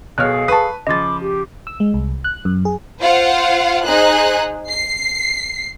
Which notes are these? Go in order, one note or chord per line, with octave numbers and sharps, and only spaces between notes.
B1 B2 G#4 A4 C#5 F5 F6 F#6
B4 A5 C#6 D#6
C#3 F3 D#5 B5 C6 D6 A6
G4
E6
G#3
C2
F#6
F#2
G#4
F4 C5 F5 F#5
D#4 G#4 C5 F#6
C7